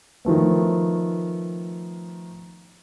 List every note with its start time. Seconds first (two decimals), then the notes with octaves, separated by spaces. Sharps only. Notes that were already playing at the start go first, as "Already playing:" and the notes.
0.25 D#3 F3 A3 B3